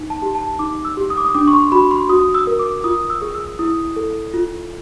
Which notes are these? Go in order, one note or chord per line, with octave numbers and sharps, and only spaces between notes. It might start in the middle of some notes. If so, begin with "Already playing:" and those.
Already playing: D#4
A5
G4
A5
D#4 D6
E6
G4
D#6
D6
D#6
D4 D6
C#6
C6
F#4 B5
C6
F#4 D#6
E6
A#4
D6
F4 D#6
E6
G#4
E6
E4 D#6
A4
F4